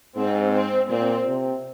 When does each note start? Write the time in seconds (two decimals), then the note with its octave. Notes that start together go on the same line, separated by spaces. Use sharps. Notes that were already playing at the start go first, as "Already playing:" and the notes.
0.16 G#2 C4
0.54 C4
0.90 A#2 C4
1.27 C3